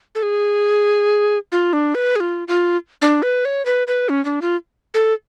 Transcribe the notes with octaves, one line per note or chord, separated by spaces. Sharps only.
A4
G#4
F4
D4
B4
G#4
F4
F4
D4
B4
C#5
B4
B4
C#4
D4
F4
A4